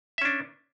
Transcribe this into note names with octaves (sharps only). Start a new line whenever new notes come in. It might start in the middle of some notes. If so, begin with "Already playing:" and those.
C#4 D4 E5